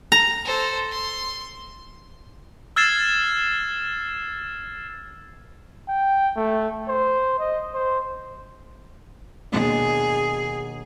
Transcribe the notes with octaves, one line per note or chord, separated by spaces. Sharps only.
A#5
A4 C5
C6
E6 F6 G#6 A6 C7 E7
G5
A3
C5
D#5
C5
D#2 B2 D4 G#4